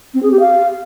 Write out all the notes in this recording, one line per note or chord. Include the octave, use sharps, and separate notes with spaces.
C4
G#4
G4
F5